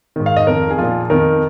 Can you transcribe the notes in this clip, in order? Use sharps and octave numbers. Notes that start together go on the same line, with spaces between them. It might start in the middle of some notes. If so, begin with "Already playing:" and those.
G#2 D#3
F5
D#5
F2 D#3 A#4
G#4
A#2 F3 F4
F2 D#3 A#4